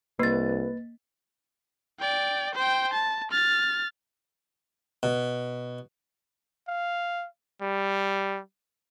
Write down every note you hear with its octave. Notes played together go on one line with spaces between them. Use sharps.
C2 A#3 B4 A6
D5 G5
C5 G5
A5
F6 A6
B2
F5
G3